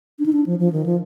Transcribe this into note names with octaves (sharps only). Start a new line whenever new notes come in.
D4
D#4
D4
F3
F3
D#3
F3